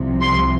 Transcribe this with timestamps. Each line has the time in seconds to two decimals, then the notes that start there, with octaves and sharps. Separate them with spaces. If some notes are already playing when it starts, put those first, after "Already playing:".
Already playing: C2 C3 F3
0.21 C6